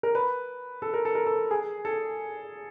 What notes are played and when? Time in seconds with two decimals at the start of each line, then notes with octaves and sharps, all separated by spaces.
0.03 A#4
0.15 B4
0.82 A4
0.94 A#4
1.05 A4
1.15 A#4
1.27 A4
1.51 G#4
1.85 A4